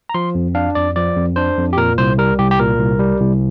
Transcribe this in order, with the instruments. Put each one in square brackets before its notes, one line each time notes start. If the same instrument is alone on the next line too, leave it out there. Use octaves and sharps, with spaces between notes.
[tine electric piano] A#5
F3 C6
F2
D4 F5
F2 D5
F3 D5
F2
D4 C5
F2
G4
A#2 A#4
C2 C5
G3 A#4
C2 G4
G4
A#2 A#4
C2
G3
C2